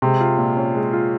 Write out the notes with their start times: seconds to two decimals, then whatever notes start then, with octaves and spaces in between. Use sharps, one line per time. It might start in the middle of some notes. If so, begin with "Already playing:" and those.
0.02 C3 G#3
0.20 F4
0.38 A#2
0.57 C#4
0.74 G#3
0.93 F4